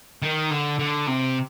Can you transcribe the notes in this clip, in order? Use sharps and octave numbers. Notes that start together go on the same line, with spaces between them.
D#3
D3
D3
C3